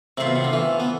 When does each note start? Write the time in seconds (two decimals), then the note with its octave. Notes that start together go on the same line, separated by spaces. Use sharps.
0.17 C3 A3 C4 F4
0.27 B2
0.36 C3
0.44 D3
0.53 E3
0.80 B3